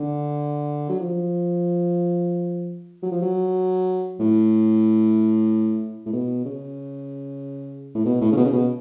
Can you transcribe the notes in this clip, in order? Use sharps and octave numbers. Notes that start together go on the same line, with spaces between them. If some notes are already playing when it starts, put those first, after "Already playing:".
Already playing: D3
F#3
F3
F#3
F3
F#3
A2
A2
B2
C#3
A2
B2
A2
C#3
B2
C#3
B2